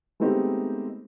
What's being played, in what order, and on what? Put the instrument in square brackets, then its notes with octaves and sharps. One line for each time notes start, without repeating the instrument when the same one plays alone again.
[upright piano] G#3 A3 B3 C4 D#4 G4